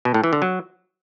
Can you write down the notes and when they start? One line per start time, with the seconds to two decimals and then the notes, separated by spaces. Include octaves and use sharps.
0.05 B2
0.14 A2
0.24 E3
0.33 D3
0.42 F#3